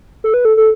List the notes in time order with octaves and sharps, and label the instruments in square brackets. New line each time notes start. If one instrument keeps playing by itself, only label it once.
[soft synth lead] A4
B4
A4
A4